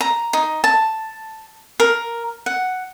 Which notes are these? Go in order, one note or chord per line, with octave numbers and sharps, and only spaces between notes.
A#5
D#4
A5
A#4
F#5